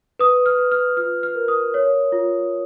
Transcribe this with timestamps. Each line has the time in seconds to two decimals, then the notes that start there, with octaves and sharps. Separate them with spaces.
0.19 B4 D#6
0.46 F6
0.59 B4
0.71 F6
0.97 F4 F6
1.23 F6
1.35 A#4
1.48 D#6
1.74 C#5
2.12 F4